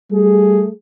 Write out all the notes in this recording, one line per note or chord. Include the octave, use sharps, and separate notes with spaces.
G3 A3 G#4